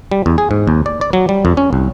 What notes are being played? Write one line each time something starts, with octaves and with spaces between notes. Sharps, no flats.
G3
E2
G#4
G#2
D#2
D5
D5
F#3
G3
F2
C#4
C2